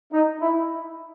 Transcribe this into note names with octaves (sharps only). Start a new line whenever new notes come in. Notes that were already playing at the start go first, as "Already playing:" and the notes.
D#4
E4